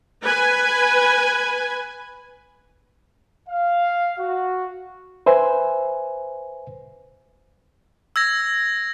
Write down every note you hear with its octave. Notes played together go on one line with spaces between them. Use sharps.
B4 G#5
F5
F#4
B4 C5 E5 G#5
E6 G#6 A#6